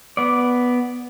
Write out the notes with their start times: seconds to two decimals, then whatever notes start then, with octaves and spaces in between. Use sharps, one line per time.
0.17 B3 D5